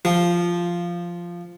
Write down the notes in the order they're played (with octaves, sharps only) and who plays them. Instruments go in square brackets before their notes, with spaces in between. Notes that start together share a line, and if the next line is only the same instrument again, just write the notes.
[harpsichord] F3